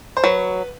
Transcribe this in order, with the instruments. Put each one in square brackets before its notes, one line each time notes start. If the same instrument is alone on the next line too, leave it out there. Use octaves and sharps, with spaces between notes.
[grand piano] C5
[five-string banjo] F#3 [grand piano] B4